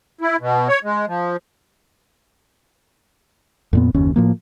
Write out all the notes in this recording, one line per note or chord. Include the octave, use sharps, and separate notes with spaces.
E4
B2
C#5
G#3
F3
F2 A#2 B3
F#1 D#2 C#4
A2 F3 A#3